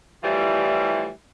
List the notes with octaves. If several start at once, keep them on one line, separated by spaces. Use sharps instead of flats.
A2 E3 F3 G3